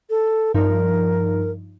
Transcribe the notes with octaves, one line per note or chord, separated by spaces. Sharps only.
A4
G2 F3 D#4 A#4